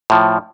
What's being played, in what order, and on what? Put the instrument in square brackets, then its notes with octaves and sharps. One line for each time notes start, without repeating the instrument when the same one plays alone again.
[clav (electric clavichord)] A2 F3